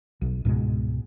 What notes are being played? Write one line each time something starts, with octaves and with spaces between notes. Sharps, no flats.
B1
C#2 G#2 B2 G#3